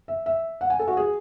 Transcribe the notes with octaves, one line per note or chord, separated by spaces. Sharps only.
E5
E5
F#5
G#5
A4
F#4
G#4